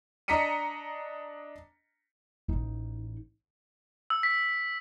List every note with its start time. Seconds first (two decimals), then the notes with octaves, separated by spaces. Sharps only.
0.28 D4 D#5 A#5 B6 C#7 D#7
2.49 A1 D#4
4.10 E6
4.23 B6